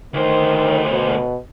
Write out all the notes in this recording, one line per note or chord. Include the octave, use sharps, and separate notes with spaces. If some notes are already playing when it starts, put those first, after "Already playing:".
D2 D#3 C5
B2